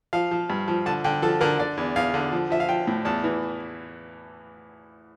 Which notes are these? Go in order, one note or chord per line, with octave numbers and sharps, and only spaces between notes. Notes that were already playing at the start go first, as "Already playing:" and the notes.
F3 F5
F3
G2
F3
D3 A5
D3 G5
F3 A4
D3 A#4
D3 D5
E2
E2 F5
D3
F3
F3 E5
F5
F3 G5
A2
E2 A5
E3